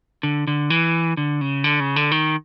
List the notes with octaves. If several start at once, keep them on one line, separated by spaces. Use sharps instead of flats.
D3
D3
E3
D3
C#3
D3
C#3
D3
D#3